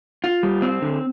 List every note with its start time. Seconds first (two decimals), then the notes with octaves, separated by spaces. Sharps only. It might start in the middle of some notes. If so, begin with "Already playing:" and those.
0.24 F4
0.43 G3
0.62 C4
0.82 D3